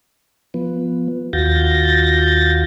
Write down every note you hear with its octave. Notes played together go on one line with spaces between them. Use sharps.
F3 B3
D#2 F4 F#4 G6 A6 A#6